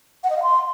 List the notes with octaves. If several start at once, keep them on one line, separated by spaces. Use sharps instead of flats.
F#5
D#5
F5
C6